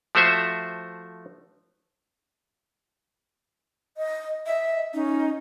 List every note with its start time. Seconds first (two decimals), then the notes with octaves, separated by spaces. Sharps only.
0.15 F3 A3 F#4 C5 E5
3.97 D#5
4.46 D#5 E5
4.94 C#4 D#4